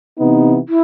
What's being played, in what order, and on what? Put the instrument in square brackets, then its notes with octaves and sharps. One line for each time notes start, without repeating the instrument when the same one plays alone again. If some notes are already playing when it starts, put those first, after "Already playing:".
[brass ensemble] C3 E3 B3 D#4
[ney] E4